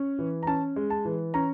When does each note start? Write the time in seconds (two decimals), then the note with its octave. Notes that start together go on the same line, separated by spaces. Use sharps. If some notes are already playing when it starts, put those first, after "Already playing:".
Already playing: C#4
0.19 E3
0.43 A#5
0.47 C#4 A5
0.76 G#3
0.90 A5
1.05 E3
1.34 C#4 A#5